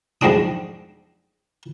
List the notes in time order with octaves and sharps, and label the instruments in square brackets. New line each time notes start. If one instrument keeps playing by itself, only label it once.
[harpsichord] B1 F2 G#3 C4 D4 D#6